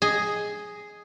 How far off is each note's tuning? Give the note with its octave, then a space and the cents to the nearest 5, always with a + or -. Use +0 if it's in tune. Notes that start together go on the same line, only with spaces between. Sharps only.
G#4 +0 D#5 +0